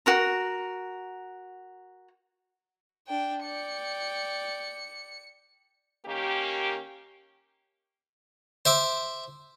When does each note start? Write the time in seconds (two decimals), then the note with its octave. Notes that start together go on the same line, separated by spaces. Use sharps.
0.06 F#4 A#4 A#5
3.07 D4 G5
3.44 D5 G5 C#7
6.06 D#3 A#3 C#4 G4
8.65 C5 E5 D6